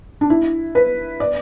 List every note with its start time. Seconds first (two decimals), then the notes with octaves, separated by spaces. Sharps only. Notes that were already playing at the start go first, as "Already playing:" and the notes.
0.21 D4
0.30 E4
0.75 B4
1.20 D5